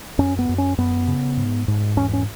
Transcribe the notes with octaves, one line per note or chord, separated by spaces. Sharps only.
F#2 C#4
B3
F#2
C#4
F#2 B3
C#3
G#2
G#2
E2 C#4
C#4